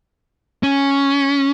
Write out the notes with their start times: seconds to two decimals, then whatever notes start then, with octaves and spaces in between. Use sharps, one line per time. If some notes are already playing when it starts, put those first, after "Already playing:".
0.63 C#4